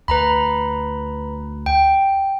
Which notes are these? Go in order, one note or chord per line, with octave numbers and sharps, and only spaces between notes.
D2 B4 A#5 B5
G5